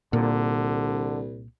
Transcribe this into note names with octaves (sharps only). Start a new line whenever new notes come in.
C2 A#2 D3